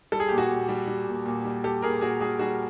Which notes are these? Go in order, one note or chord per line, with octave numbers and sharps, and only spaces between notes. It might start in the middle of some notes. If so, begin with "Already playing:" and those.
G3 A4
G#4
A#2 G4
F#4 G#4
A#2
G3
G3
A#2
A#2
G3
G3 G4 A4
A#2 G#4 A#4
A#2 F#4 G#4
G3 F#4 G#4
G3 F#4 G#4